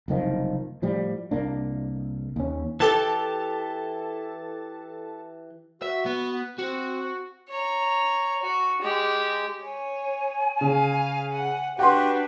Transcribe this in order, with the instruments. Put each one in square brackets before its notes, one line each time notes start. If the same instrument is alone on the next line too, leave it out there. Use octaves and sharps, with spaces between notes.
[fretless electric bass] F#1 C2 D#3 F3
A2 F3 G3
C2 A#3 D4
D#2 C#4
[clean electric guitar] E3 G4 [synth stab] A4 A5
[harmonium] F#4 [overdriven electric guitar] E5
[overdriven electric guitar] B3
[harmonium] C4 [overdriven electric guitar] F#4
[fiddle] C#5 A#5
F#4
G#3 G4
[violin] C#5 [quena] G#5
[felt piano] C#3 [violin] F5
[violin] F#5
[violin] D4 B4 [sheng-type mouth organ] F#4 G4 [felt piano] F#5 C6